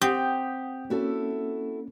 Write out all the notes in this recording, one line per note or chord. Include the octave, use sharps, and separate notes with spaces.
C4 G4 F#5 D#6 G6
A#3 C#4 E4 F#4 A4